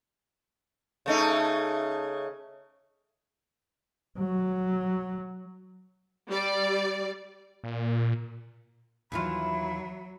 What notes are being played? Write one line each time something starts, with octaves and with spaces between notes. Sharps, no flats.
C#3 A3 D#4
F#3
G3 D5
A#2
D#2 E3 F#3 F4 B5